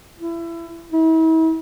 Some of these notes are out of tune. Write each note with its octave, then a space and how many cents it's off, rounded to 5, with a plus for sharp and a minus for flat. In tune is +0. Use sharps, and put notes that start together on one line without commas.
E4 +25
E4 -40